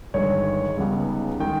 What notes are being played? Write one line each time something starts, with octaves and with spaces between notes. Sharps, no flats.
G1 G2 D#3 G#3 C#5
C#2 C#3 G3 B3 D#4
D#3 G#3 D#4 G5